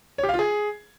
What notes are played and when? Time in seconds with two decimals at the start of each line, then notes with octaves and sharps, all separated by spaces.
0.18 C#5
0.23 G4
0.29 F5
0.34 F4
0.39 G#4